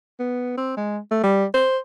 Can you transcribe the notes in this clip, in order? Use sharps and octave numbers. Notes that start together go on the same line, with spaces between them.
B3
C4
G#3
A3
G3
C5